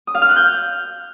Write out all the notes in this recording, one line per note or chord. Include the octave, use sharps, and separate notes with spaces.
D#6
F5
F6
F#6
G6